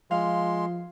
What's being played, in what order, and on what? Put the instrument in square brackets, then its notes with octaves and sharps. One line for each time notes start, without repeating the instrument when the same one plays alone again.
[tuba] F3 [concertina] G#3 C6 [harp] F5